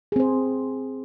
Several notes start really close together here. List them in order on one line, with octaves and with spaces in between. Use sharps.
G#4 C4 C5